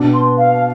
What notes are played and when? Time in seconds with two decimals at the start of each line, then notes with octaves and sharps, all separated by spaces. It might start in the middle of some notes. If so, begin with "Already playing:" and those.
Already playing: B2 B3 D4
0.13 C6
0.37 F5